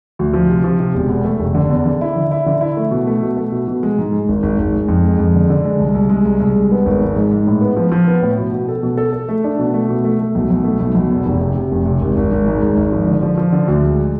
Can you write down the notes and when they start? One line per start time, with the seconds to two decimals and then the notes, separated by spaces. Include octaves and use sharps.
0.19 D2
0.33 F3
0.49 C3
0.64 F3
0.80 C3
0.94 E1
1.09 E2
1.25 A3
1.39 F1
1.55 D3
1.70 E2
1.86 D3
2.01 E4
2.16 D3
2.31 E4
2.46 D3
2.61 E4
2.77 A3
2.91 B2
3.07 A3
3.22 B2
3.37 A3
3.52 B2
3.68 B2
3.83 G#3
3.98 G#2
4.13 G#3
4.29 G#1
4.43 G#1
4.58 G#1
4.73 G#3
4.88 F2
5.04 G#3
5.18 F2
5.35 D3
5.50 D3
5.65 G#3
5.79 C2
5.95 C2
6.10 G#3
6.25 C2
6.40 C2
6.56 G#3
6.71 B3
6.86 G#1
7.02 G#2
7.16 G#2
7.31 G#2
7.47 A2
7.61 B3
7.76 F3
7.92 F3
8.07 B3
8.22 A2
8.38 B2
8.53 B2
8.68 A4
8.83 B2
8.97 A4
9.13 A4
9.29 A3
9.44 D4
9.59 B2
9.74 A3
9.88 B2
10.04 A3
10.20 A3
10.35 B1
10.50 B1
10.64 A3
10.80 B1
10.95 B1
11.11 E2
11.26 F1
11.41 C3
11.55 C3
11.72 F1
11.86 C3
12.01 G#1
12.17 G#1
12.32 G#1
12.47 G#2
12.62 G#1
12.77 G#1
12.92 F3
13.07 D3
13.23 F3
13.37 F3
13.52 D3
13.68 D2
13.83 G#3